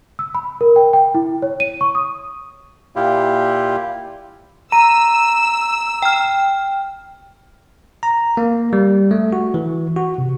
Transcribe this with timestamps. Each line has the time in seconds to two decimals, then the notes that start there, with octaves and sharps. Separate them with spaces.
0.19 E6
0.35 B5
0.61 A#4
0.76 G5
0.93 G5
1.15 E4
1.42 C#5
1.60 D#7
1.81 C#6
1.95 D#6
2.96 A#2 E4 F4 G4
4.72 A#5 E6 D#7
6.02 G5 F6
8.03 A#5
8.37 A#3
8.73 G3
9.11 A3
9.33 F#4
9.54 E3
9.96 F#4
10.18 C3